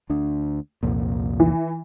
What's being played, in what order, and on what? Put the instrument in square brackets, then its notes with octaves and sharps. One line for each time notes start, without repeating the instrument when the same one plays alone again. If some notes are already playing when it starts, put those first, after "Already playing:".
[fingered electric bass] D2 D4
C2 F2 A#2
[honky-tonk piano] E3